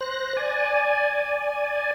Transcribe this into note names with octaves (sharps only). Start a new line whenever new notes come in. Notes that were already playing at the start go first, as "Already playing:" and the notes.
C5 F#6 A#6
D5 G#5